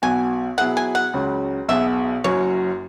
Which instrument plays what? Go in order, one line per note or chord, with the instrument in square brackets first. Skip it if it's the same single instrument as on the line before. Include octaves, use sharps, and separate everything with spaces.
[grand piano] B1 B2 B3 F#4 [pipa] G#5
[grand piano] B2 F#3 B3 E4 G#4 [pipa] F#5
[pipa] G#5
F#5
[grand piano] C#2 C#3 F#3 C#4
[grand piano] B1 B2 B3 G#4 [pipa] E5
[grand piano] F#1 F#2 F#3 [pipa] C#5